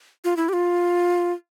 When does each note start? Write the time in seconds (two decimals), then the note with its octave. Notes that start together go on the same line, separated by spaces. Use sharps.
0.24 F4
0.37 E4
0.49 G4
0.53 F4